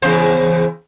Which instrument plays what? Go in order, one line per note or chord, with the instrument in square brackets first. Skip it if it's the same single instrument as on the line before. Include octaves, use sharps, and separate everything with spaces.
[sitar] E2 C#3 C5